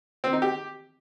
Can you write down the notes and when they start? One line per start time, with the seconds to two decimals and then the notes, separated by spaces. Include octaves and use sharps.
0.24 C4
0.33 D#4
0.42 G4